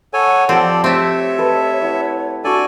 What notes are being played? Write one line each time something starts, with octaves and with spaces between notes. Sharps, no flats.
A4 C#5 F#5 G#5
F3 C4 G4 A4 D5 A5
A3 C4 G4 C#5 E5
A4 B4 D#5
E4 F#5
D4 F#4 A4 D5 G#5